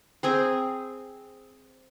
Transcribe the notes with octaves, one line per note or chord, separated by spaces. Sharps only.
C4 G#4 G#5 A#5